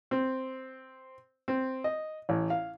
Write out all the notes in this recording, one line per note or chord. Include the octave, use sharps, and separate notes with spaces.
C4
C4
D#5
A1
F5